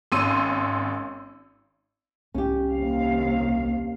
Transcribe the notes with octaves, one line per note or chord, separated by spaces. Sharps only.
G#1 C#4 C6 E6 D#7
C2 C#4 G4
D#2 C3 F5